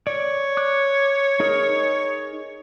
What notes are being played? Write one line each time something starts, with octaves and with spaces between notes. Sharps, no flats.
C#5 D5
D6 F#6
D#4 G#4 A#4